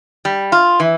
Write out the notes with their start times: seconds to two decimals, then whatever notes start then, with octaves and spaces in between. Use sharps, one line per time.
0.25 G3
0.52 F4
0.80 E3